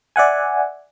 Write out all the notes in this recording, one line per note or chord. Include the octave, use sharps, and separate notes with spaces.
D5 E5 F#5 G#5